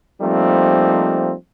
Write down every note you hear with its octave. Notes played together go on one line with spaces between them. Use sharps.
F3 G3 A3 A#3 C4 D#4